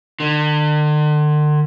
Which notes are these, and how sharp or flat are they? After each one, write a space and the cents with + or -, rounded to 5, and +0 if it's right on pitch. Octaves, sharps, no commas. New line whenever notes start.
D3 +40